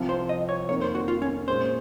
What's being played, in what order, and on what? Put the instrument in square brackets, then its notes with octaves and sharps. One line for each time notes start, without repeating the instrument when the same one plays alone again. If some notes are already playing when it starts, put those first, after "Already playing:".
Already playing: [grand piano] C2 C3 F3 C4
[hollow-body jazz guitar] C5
D#5
C#5
[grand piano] F2 D#3 A#3 [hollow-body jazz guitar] C#5
[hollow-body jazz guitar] C5
F#4
F4
C#4
[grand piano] A#2 G#3 C#4 [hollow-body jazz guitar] C5